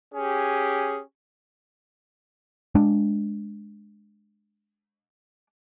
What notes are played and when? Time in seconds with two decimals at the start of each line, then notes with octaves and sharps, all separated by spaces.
0.14 C#4 G4 G#4
2.75 G#3 D4